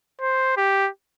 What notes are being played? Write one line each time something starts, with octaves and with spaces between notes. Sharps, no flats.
C5
G4